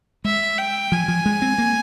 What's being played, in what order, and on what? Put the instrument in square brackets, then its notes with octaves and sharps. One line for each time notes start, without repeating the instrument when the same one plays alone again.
[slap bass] G#3 [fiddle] E5
[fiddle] G5
[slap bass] F3 [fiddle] G#5
[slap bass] F3
G#3
C4
A#3